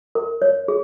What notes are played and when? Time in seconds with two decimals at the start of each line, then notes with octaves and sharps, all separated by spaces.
0.15 A#4
0.42 C#5
0.68 G#4